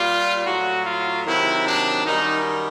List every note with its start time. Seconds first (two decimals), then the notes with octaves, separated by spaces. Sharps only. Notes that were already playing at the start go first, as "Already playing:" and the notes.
Already playing: A#2 G3 F4
0.44 A2 F#3 F#4
0.84 F4
1.24 C3 D#3 F#3 E4
1.65 D4
2.04 F#2 D#3 G3 D#4